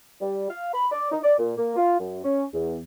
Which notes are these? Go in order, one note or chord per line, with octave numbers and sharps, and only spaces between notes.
G3
F5
B5
D5
D#4
D5
A#2
A#3
F4
F#2
C#4
E2